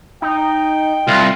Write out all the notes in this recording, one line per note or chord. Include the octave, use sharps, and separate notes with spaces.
D#4 G5
C2 F4